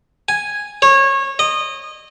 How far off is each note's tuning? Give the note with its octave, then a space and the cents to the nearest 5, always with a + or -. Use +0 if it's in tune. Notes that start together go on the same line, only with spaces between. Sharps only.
G#5 -5
C#5 -25
D#5 -20